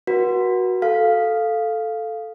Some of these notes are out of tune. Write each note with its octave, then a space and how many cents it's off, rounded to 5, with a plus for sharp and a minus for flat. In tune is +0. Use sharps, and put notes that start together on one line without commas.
F#4 +0 B4 -45
A4 +0 F5 +0